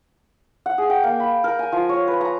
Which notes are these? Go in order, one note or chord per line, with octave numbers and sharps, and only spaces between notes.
F#5
G#4
G5
A#3
B5
A#4
G#5
F3
C#5
B4
A#5